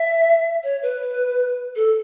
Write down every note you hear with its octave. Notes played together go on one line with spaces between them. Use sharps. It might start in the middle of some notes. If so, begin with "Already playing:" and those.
Already playing: E5
C#5
B4
A4